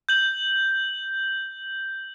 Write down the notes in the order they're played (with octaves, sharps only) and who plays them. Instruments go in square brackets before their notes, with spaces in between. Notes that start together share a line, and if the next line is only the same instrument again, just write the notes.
[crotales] G6 F#7